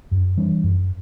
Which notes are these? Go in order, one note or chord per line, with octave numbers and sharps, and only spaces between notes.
F#2
E3 G3 D4
F#2